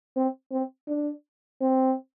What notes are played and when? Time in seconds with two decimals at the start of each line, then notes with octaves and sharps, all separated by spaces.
0.16 C4
0.52 C4
0.88 D4
1.61 C4